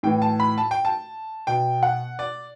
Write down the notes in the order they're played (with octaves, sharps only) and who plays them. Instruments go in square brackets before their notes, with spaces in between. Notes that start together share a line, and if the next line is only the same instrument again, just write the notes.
[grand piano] A2 E3 G5
A5
B5
A5
G5
A5
B2 G5
F#5
D5